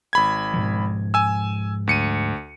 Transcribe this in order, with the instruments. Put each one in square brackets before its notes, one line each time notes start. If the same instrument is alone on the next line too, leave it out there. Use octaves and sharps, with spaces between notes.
[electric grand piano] G#1 B5 G#6
[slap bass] G#2 B2 F3
[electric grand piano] G#5 E6
D2 C#7 D#7